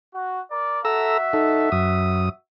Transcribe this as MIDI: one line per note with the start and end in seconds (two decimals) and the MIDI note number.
0.13 0.40 66
0.51 0.81 70
0.51 0.81 74
0.85 2.38 66
0.85 1.17 69
0.85 2.38 76
0.85 1.17 82
0.85 1.17 88
1.33 1.70 63
1.33 1.70 69
1.72 2.29 42
1.72 2.29 87